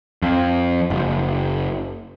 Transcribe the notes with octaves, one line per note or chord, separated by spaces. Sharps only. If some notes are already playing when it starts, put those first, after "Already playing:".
F2
F#1